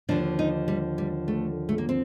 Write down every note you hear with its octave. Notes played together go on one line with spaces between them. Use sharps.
D#2 D3 F3 D4
D#4
G3
G3
A3
A3
A#3
C4